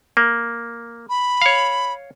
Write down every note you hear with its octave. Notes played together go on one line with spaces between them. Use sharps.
A#3
B5
C#5 F5